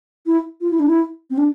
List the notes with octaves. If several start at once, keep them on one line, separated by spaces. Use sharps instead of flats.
E4
F4
E4
D4
E4
C4
D4